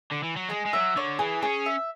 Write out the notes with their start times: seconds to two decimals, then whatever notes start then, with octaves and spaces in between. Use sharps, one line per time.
0.12 D3
0.24 E3
0.37 F#3
0.49 G#3 G#4
0.66 G#3
0.73 F#3 E5
0.96 D3 C#5
1.19 E3 G#4
1.42 C#4 G#4
1.66 E5